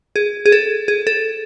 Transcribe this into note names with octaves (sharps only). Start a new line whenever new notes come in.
G#4
G#4
A4
G#4
A4